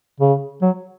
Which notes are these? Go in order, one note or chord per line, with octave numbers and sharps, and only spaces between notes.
C#3
F#3